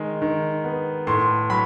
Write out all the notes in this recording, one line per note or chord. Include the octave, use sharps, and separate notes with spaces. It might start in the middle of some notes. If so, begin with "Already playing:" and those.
Already playing: D#3 G#3
D#3
B3
A2 C6
F#3 B5